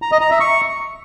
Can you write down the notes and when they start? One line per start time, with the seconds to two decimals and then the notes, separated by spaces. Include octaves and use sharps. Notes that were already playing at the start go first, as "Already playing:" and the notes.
0.02 A#5
0.12 D#5
0.21 A#5
0.31 E5
0.40 C#6